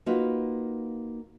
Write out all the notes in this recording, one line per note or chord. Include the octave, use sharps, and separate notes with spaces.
A#3 D#4 F4 F#4 B4